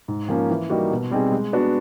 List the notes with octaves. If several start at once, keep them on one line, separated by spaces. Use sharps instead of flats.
G#2
F3 A#3 C#4
E3
G3 A#3 D#4 F#4
B2
G3 C4 D#4 G#4
G#3
B3 D4 F#4